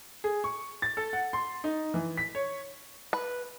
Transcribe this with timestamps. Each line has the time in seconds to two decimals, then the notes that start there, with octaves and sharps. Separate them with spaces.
0.24 G#4
0.44 C#6
0.82 A6
0.97 A4
1.13 F#5
1.33 C6
1.64 D#4
1.94 E3
2.17 B6
2.35 C#5
3.13 B4